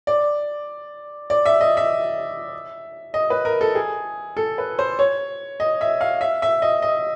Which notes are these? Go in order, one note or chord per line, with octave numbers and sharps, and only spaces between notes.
D5
D5
E5
D#5
E5
D#5
B4
A#4
A4
G#4
A4
B4
C5
C#5
D#5
E5
F5
E5
E5
D#5
D#5